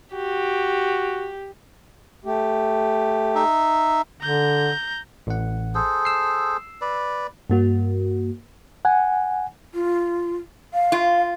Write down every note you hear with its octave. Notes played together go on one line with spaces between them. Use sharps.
F#4 G4
A3 G4
D#4 E5
D3 A#5 G6
A1 F#5
G#4 A4 C5
E6 C7
B4 D5
G2 A#3 F#4
F#5 G#5
F4
F5
F4